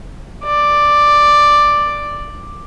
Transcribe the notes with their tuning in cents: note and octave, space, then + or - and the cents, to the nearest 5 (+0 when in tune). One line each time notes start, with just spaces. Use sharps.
D5 +5